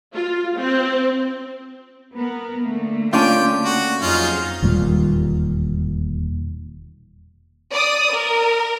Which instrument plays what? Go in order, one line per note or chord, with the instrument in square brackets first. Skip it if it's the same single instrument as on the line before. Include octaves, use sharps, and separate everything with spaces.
[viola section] F4
C4
[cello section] B3 A#4
D3 A3 A#3
[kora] C#4 D4 F4 [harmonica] G5
[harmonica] F#4
[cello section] F2 F#3 G#4 [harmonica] C#4 D#4 F4
[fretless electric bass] E1 D#2 A#2 G3
[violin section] D5 D#6
A#4